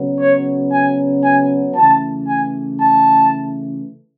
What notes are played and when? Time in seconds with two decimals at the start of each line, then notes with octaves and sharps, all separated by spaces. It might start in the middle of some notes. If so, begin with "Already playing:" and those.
Already playing: C#3 F#3 B3
0.20 C#5
0.72 G#5
1.24 G#5
1.76 C#3 E3 A3 A5
2.28 G#5
2.81 A5